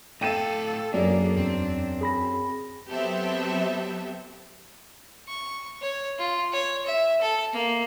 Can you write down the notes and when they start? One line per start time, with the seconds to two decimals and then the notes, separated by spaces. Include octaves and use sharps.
0.21 A2 A4 F5 G5 D#7 E7
0.94 F#2 A#3 D4 G#4 D5
1.37 E2 C4
2.01 G#4 B5 A#6
2.90 F#3 B3 C4 G4 A4 E5
5.28 C#6
5.81 C#5
6.18 F4
6.52 C#5
6.86 E5
7.21 A4
7.53 A#3